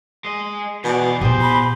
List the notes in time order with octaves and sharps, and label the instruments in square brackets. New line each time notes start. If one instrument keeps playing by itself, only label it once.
[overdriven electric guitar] G#3 D#5
[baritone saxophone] B2 [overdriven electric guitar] E3 D5
[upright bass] A#2 B3 [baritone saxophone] G4 [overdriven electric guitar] G#4 C5
[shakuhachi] B5